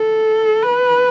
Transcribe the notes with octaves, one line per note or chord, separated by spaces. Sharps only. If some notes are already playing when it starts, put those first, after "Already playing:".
Already playing: A4
B4